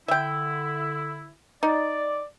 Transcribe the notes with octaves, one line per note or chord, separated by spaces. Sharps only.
D3 E4 E5 G5
D#4 D5